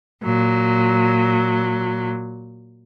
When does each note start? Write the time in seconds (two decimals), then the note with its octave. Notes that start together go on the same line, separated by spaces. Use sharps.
0.23 A#2 F#3